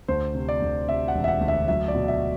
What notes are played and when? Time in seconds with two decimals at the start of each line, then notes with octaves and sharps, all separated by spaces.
0.08 D2 C5
0.35 C3
0.49 D5
0.62 D2
0.88 C3 E5
1.08 F#5
1.15 E1
1.24 E5
1.28 F#5
1.41 D2
1.48 E5
1.68 F#3 E5
1.88 D5
1.94 B2
2.08 E5